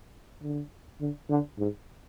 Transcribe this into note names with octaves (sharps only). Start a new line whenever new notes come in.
D3
D3
D3
G#2